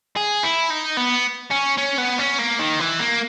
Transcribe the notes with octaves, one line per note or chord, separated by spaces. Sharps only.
G#4
E4
D#4
B3
C#4
C#4
B3
C#4
A#3
D#3
E3
A#3